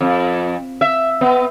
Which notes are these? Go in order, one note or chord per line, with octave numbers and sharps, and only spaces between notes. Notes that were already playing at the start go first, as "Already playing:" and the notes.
F2
E5
B3